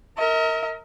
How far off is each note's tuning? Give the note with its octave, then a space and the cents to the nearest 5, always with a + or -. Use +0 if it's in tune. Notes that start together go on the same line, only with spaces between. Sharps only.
A#4 -20 D#5 +45